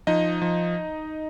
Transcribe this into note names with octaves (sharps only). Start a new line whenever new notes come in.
F3 D#4 D#5
F3